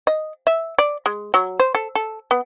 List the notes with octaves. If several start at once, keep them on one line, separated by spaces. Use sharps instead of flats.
D#5
E5
D5
G#3
F#3
C5
A4
A4
B3